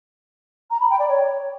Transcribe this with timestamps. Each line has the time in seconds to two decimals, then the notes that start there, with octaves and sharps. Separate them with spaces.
0.71 A#5
0.80 B5
0.90 G5
0.99 D5
1.09 C#5